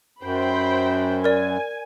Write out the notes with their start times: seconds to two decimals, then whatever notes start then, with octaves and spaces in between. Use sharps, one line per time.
0.23 F#2 C5 G5 B5
1.24 A#4 D5 G#5